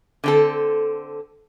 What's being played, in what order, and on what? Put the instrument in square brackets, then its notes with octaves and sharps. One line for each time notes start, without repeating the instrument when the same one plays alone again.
[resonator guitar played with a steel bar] D3 C4 A4